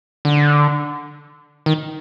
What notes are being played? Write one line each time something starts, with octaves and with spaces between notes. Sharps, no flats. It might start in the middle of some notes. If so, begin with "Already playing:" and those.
D3
D#3